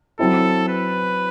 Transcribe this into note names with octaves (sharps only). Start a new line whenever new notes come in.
F#3 C4 E4 A4
B4